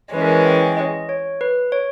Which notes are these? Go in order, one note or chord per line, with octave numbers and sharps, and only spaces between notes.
E3 G#3 C#4 B4
A#4
B4
G5
D#5
C#5
B4
C#5